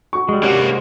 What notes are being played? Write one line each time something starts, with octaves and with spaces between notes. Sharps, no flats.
F#4 C#6
G3 G#3
C3 A#3 C#4 F#4 D5 F#5
G#3 C5